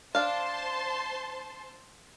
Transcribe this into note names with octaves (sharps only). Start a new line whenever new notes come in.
D4 C5 F5 A5 C6